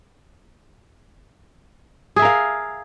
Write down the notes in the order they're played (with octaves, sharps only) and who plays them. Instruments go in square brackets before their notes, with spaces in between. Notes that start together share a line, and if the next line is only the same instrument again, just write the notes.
[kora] G#4
E5
A#4
F5